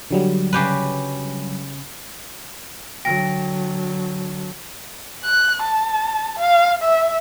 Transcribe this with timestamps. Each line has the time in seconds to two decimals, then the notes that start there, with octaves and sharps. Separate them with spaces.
0.11 D3 F#3 G3
0.53 C#3 G4 B4
3.05 D3 F#3 G5 A#6
5.24 F#6
5.62 A5
6.39 F5
6.83 E5